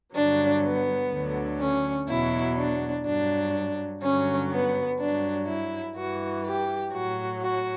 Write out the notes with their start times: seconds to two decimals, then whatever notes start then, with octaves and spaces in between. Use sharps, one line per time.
0.15 G2 D3 F#3 D4
0.64 B3
1.12 D2 D3 F#3
1.60 C#4
2.09 E2 B2 F#3 E4
2.57 D4
3.05 G2 F#3 D4
4.02 G2 D3 F#3 C#4
4.51 B3
5.00 G2 F#3 D4
5.48 E4
5.96 G2 E3 F#4
6.45 G4
6.93 A2 F#3 F#4
7.42 F#4